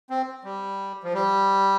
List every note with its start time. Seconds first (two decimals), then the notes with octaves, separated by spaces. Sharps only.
0.10 C4
0.44 G3
1.04 F3
1.14 G3